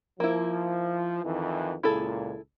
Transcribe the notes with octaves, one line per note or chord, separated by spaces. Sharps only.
F3 A#3 E4
F2 D#3 E3
C#2 A#2 E4 G#4 A4